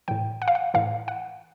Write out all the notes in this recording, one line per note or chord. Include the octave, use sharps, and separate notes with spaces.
A2 E3 G5
F#5
F5
F#5
A2 E3 F5
F#5